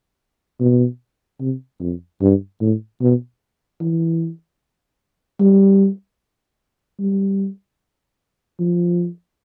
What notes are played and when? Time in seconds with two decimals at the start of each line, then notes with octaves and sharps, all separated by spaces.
0.61 B2
1.41 C3
1.80 F2
2.21 G2
2.61 A2
3.01 B2
3.81 E3
5.39 G3
6.99 G3
8.59 F3